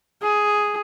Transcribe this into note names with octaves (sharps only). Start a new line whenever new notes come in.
G#4